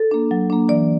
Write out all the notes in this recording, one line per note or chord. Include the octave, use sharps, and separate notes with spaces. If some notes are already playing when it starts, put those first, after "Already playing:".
Already playing: A4
A#3 D4
F#3
A#3 D4
E3 D5